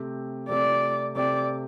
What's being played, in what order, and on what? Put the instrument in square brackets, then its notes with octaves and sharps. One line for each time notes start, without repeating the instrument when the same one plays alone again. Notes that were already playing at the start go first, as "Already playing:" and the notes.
Already playing: [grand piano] C3 A3 C4 G4
[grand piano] C3 A3 C4 G4 [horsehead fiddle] D5
[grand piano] C3 A3 C4 G4 [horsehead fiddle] D5